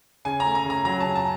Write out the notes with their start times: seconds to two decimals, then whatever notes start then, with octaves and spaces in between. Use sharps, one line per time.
0.25 C#3 G#5
0.40 A#5
0.45 A3
0.55 A#5
0.65 C#3
0.70 A#5
0.85 F#3 A#5
1.00 A5
1.06 C#3
1.15 A5